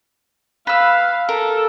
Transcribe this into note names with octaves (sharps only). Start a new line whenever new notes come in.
B4 F5 E6
A4 A#4